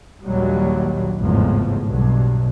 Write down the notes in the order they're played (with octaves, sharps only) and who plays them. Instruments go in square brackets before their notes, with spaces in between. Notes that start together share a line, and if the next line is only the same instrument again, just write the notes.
[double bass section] A#1 D#2 A#2 D#3 F#3 G3
G#1 E2 A2 C#3 F3
B1 G2 B2